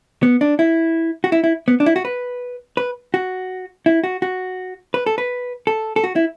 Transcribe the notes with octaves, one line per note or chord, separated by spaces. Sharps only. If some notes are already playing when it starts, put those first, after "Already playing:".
B3
D4
E4
F#4
E4
E4
B3
D4
E4
F#4
B4
B4
F#4
E4
F#4
F#4
B4
A4
B4
A4
A4
F#4
E4